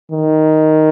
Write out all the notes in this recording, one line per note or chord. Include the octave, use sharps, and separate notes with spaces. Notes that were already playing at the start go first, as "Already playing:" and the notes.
D#3